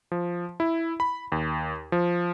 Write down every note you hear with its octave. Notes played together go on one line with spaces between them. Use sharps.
F3
E4
B5
D#2
F3